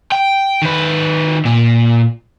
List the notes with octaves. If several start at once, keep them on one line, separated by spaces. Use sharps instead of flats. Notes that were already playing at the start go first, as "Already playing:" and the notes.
G5
D#3 B4
A#2